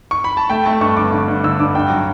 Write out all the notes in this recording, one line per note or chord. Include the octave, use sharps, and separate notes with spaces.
C#6
B5
A5
A3 G5
A3 A5
G2 C#6
G1 D6
D3
G2
D3 E6
G2 D6
G2 G5
F#3